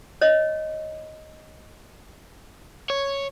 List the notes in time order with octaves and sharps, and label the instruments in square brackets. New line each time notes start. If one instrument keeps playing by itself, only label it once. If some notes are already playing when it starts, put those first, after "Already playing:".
[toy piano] C#5 D#5
[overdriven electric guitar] C#5